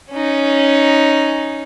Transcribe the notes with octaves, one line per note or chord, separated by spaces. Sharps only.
C#4 D#4